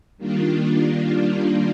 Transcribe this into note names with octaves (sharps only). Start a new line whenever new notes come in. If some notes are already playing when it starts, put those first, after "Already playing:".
D#3 G3 A#3 D4 F4